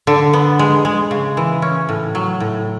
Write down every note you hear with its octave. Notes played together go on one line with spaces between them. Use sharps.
D3
B3
G#3
G#3
C#3
E3
C#4
A2
F#3
A2